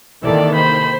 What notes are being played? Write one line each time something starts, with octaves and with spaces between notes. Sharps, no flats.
C3 D#3 E3 A#3 A4 D5
C5 B5